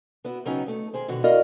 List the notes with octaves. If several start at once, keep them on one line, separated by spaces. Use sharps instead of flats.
B3 E4 F#4
C#3 F#3 B3 C#4 D#4 G5
A3 D#4
D#3 G#4 C5
B2 D3 D#3 F#4
E4 F#4 A#4 D5 D#5 F5